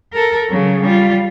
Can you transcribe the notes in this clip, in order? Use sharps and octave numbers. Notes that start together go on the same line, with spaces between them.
A4 A#4
C#3 F#3
G3 F4